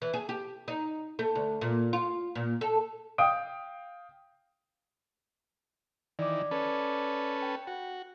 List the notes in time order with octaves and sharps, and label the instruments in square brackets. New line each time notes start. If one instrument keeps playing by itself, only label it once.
[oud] E3
G#4
G4
D#4
A3
D2
A#2
F4
A#2
A4
[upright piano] F5 G5 D#6 D7
[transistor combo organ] D#3 E3 [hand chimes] D5 D6
[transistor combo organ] C#4 A4 B4
[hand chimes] G5
[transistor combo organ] F#4